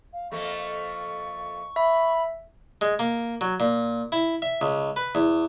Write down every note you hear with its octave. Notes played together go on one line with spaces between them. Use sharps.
F5
F2 A3 A#3 C#6
E5 B5
G#3
A#3
F#3
A#2
E4
E5
C#2
B4
E2